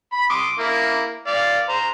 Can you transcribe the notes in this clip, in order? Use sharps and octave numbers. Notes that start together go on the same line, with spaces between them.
B5
C6 D6 D#6
A#3 E4
D5 F5
C5 A#5